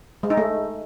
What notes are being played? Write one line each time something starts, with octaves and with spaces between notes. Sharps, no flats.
G#3
D#4
A3